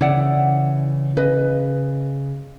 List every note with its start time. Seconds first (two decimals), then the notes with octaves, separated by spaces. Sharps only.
0.01 C#3 E3 E4 D5 F#5
1.17 C#3 B4 D#5